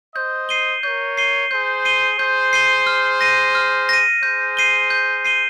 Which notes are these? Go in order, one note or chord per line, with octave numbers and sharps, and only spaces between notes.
C5 D#5 G6
C7 D#7 G7
A#4 C#5 G6
C7 D#7 G7
G#4 C5 G6
C7 D#7 G7
G#4 C5 G6
C7 D#7 G7
F6
A#6 D#7
F6
A#6 D#7
G#4 C5 G6
C7 D#7 G7
G6
C7 D#7 G7